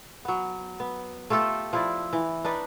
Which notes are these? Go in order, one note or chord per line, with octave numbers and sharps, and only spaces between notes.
F#3 B3
B3
A3 F4 G4 A4
F3 E4 D5
E3
D4 D#4 B4 D5